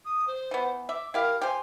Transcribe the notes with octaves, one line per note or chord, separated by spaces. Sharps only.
D#6
C5
E3 B3
E5 D6
E4 G4 A#4 F5
G4 C5 G#5